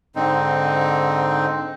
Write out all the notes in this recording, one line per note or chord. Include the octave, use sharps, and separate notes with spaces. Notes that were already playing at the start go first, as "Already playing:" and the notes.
G#2 D3 C4 D#4